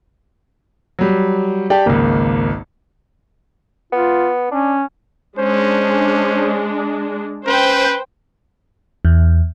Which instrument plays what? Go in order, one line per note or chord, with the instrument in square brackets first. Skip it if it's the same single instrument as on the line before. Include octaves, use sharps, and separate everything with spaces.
[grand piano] F#3 G3
[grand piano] G4 [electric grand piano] D5 G5 A5
[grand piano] G#1 C#2 [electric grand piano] A#3
[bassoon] B3 [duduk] F4
[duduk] C#4 [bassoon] D4
[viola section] G#3 D4 [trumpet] C#4 [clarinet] C5
[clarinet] C#4 [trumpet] B4 [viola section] C5 G5
[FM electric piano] E2